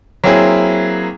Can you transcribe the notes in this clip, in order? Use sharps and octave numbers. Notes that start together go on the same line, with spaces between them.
F#3 A#3 C4 E4 G#4 E5